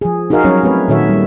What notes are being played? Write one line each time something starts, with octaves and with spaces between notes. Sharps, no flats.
F3 G#4
D#4 F#4 G#4 A#4 D#5 F5
F#3 G3 C#4 C#5
A3 C4 B4 C#5
A#2 D#3 F#4 A4 C#5 E5
G3